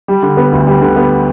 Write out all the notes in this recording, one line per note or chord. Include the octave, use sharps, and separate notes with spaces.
G3
D3
B3
D2
G3
D3
B3